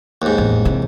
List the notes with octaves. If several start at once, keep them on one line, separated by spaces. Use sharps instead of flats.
D#2 G#2
A1 E2
C3 E3